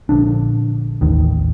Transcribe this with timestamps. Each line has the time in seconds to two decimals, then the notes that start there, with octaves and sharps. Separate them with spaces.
0.09 A#1 D3 D4
1.01 A1 D#2 D#3